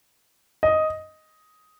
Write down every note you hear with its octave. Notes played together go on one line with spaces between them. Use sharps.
D#5